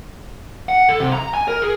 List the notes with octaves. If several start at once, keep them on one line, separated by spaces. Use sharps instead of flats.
F#5
A4
C3
A#5
G#5
A#4
G#4